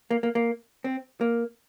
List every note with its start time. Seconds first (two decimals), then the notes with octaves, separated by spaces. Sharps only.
0.11 A#3
0.23 A#3
0.35 A#3
0.84 C4
1.21 A#3